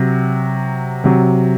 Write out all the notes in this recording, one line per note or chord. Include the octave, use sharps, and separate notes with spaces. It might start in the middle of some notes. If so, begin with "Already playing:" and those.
Already playing: C3 F#3
C3 F#3